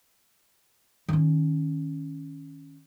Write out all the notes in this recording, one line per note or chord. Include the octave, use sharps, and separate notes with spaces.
D#3 C#4